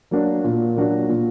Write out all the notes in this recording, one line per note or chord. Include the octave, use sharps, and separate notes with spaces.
F#3 A#3 D4 F#4
A#2
F#3 A#3 D4 F#4
A#2